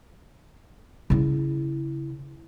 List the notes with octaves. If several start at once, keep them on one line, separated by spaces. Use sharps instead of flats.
C#3 E4